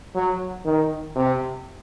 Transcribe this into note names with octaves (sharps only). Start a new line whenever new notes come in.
F#3
D#3
C3